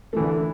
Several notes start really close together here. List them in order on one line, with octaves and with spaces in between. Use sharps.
A3 E3 D3 E4